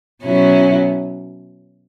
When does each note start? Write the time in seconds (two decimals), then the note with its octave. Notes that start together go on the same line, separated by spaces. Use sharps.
0.22 B2 F#3 C#4 E4